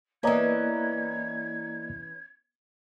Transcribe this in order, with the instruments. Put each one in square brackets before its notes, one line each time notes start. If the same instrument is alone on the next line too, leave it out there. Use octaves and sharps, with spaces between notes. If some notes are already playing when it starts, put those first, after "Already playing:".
[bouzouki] E3 C#4 [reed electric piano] A#3 D5 D#5 [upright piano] B3 A#5 [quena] G#6